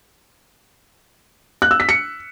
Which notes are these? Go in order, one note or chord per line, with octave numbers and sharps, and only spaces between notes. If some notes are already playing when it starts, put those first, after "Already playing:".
F#6
E6
B6
C#7